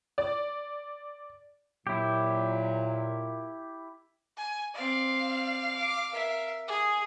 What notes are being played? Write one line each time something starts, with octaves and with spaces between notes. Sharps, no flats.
D5
A#2 F#3 E4 G4
G#5
C4 D5 F5
D6
A#4 E5
G#4 D#6